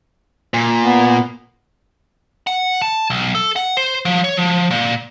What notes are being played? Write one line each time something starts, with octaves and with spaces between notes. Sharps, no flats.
A#2
B3
F#5
A5
B1
A4
F#5
C5
F3
C#5
F3
A#2